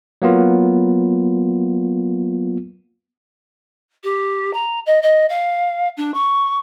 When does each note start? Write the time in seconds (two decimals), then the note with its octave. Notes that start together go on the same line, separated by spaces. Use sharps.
0.22 F#3 A#3 B3 F4
4.04 G4
4.54 A#5
4.86 D#5
5.02 D#5
5.29 F5
5.97 D4
6.14 C#6